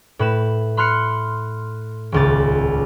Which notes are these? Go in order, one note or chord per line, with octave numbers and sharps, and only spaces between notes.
A2 B4 E7
B5 C6 F6 F#6 C7 C#7
D#1 C#2 A6